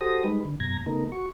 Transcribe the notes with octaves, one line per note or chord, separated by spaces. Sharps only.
F#4 G4 A4 C5 D#6 A#6
G3 G#3 D#4 B4
D3
F#2 B2 A#5 G#6 A#6
C#3 A3 B3 D#4 A#4
F#4 C#6